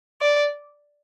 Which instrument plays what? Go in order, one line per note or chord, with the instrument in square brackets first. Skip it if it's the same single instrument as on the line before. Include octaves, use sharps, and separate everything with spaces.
[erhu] D5